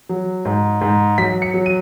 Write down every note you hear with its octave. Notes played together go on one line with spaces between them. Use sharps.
F#3
G#2
G#2
F#3 B6
C#7
F#3
D#7